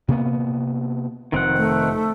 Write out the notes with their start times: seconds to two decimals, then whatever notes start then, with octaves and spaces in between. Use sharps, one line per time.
0.08 C3 A#3 B3
1.32 F1 D#3 C4 F#5
1.57 A3